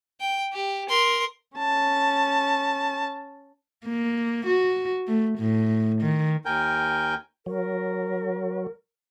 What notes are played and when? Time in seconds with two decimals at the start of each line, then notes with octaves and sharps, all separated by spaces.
0.20 G5
0.53 G4
0.89 A#4 C6
1.57 C#4 A5
3.85 A#3
4.46 F#4
5.07 A3
5.39 A2
6.02 D#3
6.45 D#2 A#4 G5 G#5 G6
7.46 F#3 A#4